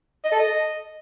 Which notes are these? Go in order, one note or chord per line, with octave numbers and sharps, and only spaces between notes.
D#5
A4
D#5